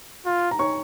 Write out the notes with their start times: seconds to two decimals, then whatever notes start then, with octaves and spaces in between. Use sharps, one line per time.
0.26 F4
0.51 A#5
0.59 C#5 C#6